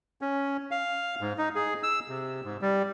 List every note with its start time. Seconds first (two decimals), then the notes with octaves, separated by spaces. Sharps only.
0.21 C#4
0.71 F5
1.21 G#2
1.38 D#4
1.55 G#4
1.83 E6
2.09 C3
2.44 G#2
2.62 G3